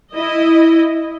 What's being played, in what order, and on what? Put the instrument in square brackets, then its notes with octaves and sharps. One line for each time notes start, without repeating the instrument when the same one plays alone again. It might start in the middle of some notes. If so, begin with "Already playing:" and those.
[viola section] E4 D#5